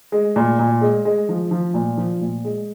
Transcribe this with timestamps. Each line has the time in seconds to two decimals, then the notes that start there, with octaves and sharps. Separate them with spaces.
0.12 G#3
0.36 A#2
0.59 A#2
0.81 G#3
1.05 G#3
1.29 F3
1.51 F3
1.74 A#2
1.97 F3
2.21 A#2
2.44 G#3